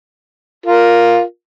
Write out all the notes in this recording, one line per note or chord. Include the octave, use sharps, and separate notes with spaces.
F4 A#4